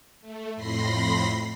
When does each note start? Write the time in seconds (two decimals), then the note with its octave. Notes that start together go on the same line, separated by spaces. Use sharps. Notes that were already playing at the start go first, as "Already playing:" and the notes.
0.20 A3
0.55 F2 A2 B5 C6 A#6 C7